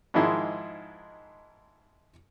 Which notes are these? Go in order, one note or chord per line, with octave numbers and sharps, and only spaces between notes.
G#2 D#3 F3 G#3 E4